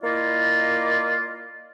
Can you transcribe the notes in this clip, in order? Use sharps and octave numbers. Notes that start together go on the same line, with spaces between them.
A#3 E4 F4 D5 D#5